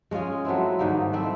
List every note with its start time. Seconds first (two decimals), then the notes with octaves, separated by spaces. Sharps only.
0.11 G#3 C#4 F4 G#4
0.45 F#3 A3 C4 E4
0.79 G#2 D#3 G3 A#3
1.13 A3 C4 E4